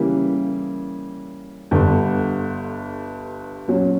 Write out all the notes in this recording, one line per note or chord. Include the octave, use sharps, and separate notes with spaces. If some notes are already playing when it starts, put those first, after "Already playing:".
Already playing: C#3 E3 G3 A#3
G1 G2 D3
A#2 F#3 C#4